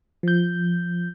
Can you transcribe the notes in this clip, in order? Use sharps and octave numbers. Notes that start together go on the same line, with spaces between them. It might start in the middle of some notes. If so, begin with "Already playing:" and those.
F3 G6